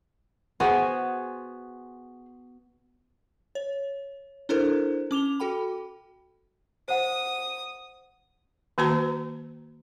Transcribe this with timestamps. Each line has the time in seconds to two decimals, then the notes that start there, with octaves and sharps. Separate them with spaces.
0.60 B3 F#4 G#4 C5 F#5 G#5
3.55 C#5
4.49 D4 E4 A4 A#4 C5
5.11 C#4 D6 F7 G7
5.40 F#4 A4 G5 B5
6.88 C5 F#5 D#6
8.78 D#3 A#3 F#4 B4 A5 A#5